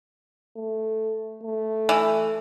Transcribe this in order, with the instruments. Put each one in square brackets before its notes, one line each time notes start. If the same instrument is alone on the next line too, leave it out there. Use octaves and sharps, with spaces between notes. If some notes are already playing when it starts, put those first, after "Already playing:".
[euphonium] A3
A3
[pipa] E3